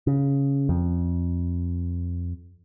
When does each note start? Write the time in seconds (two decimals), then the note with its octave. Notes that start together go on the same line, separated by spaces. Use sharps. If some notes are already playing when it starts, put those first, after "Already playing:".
0.07 C#3
0.69 F2